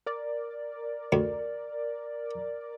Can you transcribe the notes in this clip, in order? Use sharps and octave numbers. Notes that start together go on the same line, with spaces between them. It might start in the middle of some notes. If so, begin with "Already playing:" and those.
A#4 D5
D2